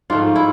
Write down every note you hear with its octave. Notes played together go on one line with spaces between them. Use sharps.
G#2 F3 A3 F4
E4